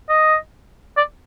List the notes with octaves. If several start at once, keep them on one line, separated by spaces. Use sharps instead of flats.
D#5
D5